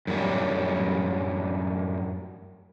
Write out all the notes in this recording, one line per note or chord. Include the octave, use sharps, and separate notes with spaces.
F#2 A2 G3